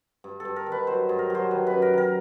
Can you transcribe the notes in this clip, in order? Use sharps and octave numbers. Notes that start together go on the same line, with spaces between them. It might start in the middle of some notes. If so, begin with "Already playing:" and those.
G2
A4
G2
A#4
D#3
B4
F#3 C5
G2
A#4
F#3 C5
D#3 B4
F#2 B4
A#4
D#3 A#4